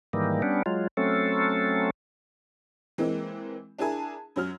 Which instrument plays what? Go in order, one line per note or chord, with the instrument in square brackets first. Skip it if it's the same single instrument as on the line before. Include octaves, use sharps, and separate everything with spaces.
[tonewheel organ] G#2 D#3 E3 G3 A#3
G3 B3 C#4 D4
F#3 G#3 F4
F#3 A3 C4 C#4 A4
[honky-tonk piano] E3 G#3 A#3 C4
D4 E4 G#4 A#4 G#5 A5
F#2 F#3 F6